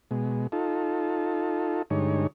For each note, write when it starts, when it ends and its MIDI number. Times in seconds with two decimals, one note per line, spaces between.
0.11 0.47 47
0.11 0.47 56
0.52 1.82 63
0.52 1.82 65
0.52 1.82 69
1.91 2.27 43
1.91 2.27 50
1.91 2.27 56
1.91 2.27 63
1.91 2.27 73